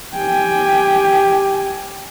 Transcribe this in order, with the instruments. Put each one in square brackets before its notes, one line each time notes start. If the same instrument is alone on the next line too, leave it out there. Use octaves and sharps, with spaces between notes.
[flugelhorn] G4 [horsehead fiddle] G5 G#5